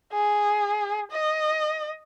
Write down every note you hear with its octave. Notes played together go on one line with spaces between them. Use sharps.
G#4
D#5